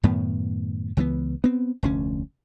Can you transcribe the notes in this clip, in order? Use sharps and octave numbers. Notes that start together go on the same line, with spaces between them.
F#2 A2 D#3 B3
C#2 E3 G#3 B3
B3 C4
F1 D2 C#4